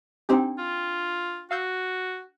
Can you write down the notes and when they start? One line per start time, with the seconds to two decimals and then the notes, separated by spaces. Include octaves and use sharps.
0.29 C4 D4 D#4 G4 G5
0.59 F4
1.51 F#4 F5 E6 G6